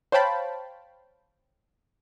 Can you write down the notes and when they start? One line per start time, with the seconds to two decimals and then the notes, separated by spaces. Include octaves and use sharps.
0.12 C5 C#5 F5 G5 A5 B5